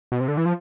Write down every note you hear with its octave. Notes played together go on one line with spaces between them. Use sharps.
B2
C3
D3
E3
F3